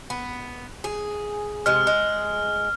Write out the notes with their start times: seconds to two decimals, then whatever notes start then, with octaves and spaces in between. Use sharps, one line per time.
0.10 B3
0.84 G#4
1.66 C3 G#3 F6
1.87 G#3